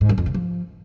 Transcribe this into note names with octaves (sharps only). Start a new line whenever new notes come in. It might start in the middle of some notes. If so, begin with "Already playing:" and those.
G#2
F#2
F2
C#3
F3